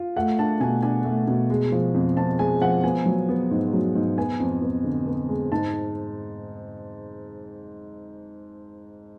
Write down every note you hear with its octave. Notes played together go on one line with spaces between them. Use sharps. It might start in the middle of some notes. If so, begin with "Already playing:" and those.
Already playing: F4
A3 F#5
D4 A5
B2 G#5
D4 G#5
A3
B2
G#3
F3
F2
F2 A5
G#3 G#5
F3 F#5
B3 G#5
F#3
B3
G#2
F#3
G#2
B3 G#5
F2
B3
D3
B3
G#3
G#2 A5